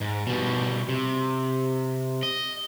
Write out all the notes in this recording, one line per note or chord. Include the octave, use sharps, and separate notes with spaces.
G#2
B2 G3
C3
D#5